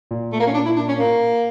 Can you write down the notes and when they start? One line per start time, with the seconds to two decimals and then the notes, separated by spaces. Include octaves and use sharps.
0.11 A#2
0.33 A3
0.40 A#3
0.47 C#4
0.54 D4
0.66 E4
0.76 D4
0.88 C#4
0.99 A#3